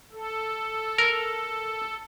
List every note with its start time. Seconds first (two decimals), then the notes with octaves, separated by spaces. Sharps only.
0.12 A4
0.98 A#4